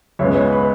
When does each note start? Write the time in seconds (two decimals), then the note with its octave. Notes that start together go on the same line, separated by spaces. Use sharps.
0.19 C#2 C#3 G#3 B3 C#5 E5
0.36 C#5
0.52 B4